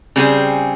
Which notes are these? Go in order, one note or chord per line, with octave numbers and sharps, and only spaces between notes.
C#3 G3 C4 D#4 G#4